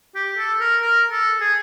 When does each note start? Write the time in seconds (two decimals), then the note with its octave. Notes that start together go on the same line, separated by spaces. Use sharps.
0.15 G4
0.38 A4
0.60 A#4
0.82 A#4
1.11 A4
1.41 G#4